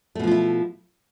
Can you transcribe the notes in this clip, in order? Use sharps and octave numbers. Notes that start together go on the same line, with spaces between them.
B2 F3 A3 E4 F4